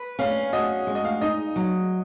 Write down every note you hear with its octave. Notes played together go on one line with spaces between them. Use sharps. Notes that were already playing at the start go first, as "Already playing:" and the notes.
Already playing: B4
C#4 F5
F#4 D#5
G#3
D#5
F5
D#4 D#5
F#3